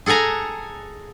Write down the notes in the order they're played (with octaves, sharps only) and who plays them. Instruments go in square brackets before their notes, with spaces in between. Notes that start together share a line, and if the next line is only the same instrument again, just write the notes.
[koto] G#4 A4 F#5 G#5 A#5